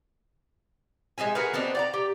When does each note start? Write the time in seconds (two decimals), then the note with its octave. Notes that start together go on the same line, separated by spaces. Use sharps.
1.18 G#3 D#4 E5 G#5
1.35 F#4 G#4 A#4 B4
1.53 B3 C4 D4 D#4
1.75 D5 F#5 A#5
1.94 G4